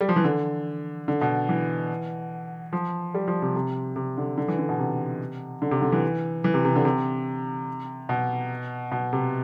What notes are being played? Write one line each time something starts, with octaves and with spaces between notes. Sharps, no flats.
G3
F3
E3
D3
D3
B2
E3
F3
G3
F3
C3
C3
C3
D3
D3
E3
D3
B2
C3
D3
C3
D3
E3
E3
C3
C3
D3
C3
B2
B2
C3